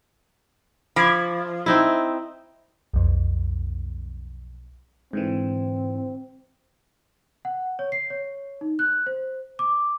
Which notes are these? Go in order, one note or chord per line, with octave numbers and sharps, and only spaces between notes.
F3 B5 D6 G#6
C4 D#4 E4
B1 F2
G#2 D3 E3 C4
F#5
C#5
C7
C#5
D#4
F#6
C5
D6